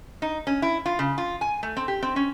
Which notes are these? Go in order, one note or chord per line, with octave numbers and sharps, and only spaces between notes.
D#4
C#4
E4
F4
C#3
F4
G#5
A3
C4
G4
C4
C#4